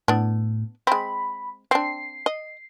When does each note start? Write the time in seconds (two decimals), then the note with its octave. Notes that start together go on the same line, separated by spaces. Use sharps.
0.08 A2 B3 D4
0.87 G#3 C4 B5
1.71 C4 D4 C7
2.26 D#5